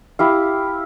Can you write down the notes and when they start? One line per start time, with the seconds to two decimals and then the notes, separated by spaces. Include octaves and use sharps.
0.19 E4 G4 F5